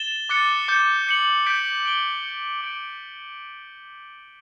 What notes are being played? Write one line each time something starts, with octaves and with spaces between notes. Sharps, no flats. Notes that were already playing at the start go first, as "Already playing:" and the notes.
Already playing: A6 E7 G7
D6 F#6 A6 C#7
D6 G6 C#7
G6 C#7 F#7
G6 B6 D7
G6 D7 G7
G6 C#7 G7
D6 G6 D7